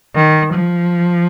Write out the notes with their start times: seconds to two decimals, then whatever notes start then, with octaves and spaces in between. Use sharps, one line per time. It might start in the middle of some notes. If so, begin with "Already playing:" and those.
0.16 D#3
0.54 F3